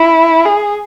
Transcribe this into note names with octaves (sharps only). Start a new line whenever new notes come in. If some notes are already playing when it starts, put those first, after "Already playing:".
Already playing: E4
G#4